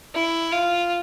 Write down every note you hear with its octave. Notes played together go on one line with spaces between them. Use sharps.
E4
F4